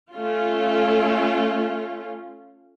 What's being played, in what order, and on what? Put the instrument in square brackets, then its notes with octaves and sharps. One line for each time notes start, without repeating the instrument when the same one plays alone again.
[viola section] A3 C#4 F4